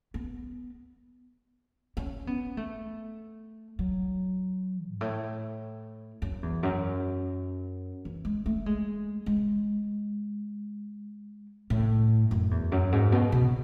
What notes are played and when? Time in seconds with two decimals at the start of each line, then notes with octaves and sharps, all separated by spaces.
0.14 B3
1.97 C#4
2.27 B3
2.57 A3
3.79 F#3
4.90 G#2
5.01 A2
6.22 F#2
6.43 E2
6.63 F#2
8.05 E3
8.25 G#3
8.46 A3
8.66 G#3
9.26 G#3
11.70 A2
12.31 F#2
12.51 E2
12.72 F#2
12.92 G#2
13.12 B2
13.32 B2